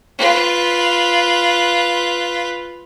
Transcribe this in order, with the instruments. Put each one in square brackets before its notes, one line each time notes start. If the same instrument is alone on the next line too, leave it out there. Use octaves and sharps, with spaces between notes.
[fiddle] F4 B4